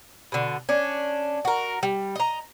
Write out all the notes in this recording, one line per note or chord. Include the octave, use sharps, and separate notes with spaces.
B2 D3
C#4 D4
F#4 A#4
G3
D#5 A#5